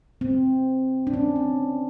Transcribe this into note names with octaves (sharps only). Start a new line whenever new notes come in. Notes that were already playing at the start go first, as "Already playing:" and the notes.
C4
D4
C#4
C4